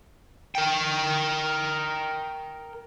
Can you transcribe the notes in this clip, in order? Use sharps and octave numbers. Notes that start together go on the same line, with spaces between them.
A#4 G5